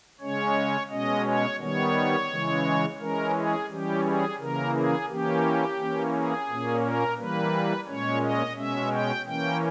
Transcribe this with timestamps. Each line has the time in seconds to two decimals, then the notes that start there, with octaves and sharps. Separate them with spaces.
0.20 C#3 G#3 C#4 C#5
0.91 B2 G#3 C#4 D#5
1.26 C#5
1.60 D#3 G3 B3 C#5
2.30 C#3 E3 G#3
3.00 E3 G#3 C#4 A#4
3.35 G#4
3.69 E3 G3 C#4 G4
4.04 G#4
4.39 C#3 E3 A#3 A#4
4.74 G#4
5.09 E3 A#3 C#4 G4
5.78 E3 A#3 C#4
6.13 G#4
6.48 A#2 A#3 C#4
6.82 A#4
7.17 E3 G3 A#3 B4
7.87 A#2 G#3 C#4 C#5
8.22 D#5
8.56 B2 G#3 C#4 E5
8.92 G5
9.26 E3 A#3 C#4 G5